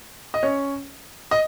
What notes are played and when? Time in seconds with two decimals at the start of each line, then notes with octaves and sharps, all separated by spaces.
0.34 D#5
0.43 C#4 C#5
1.31 D#5